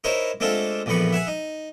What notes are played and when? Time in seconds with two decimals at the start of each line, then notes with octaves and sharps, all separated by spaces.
0.04 D#4 E4 A#4 C5 C#5
0.40 G#3 A3 C4 D4 F4 A4
0.86 A#1 E2 A2 E3 B5 C#6
1.13 E5 F#5 G#5
1.27 D#4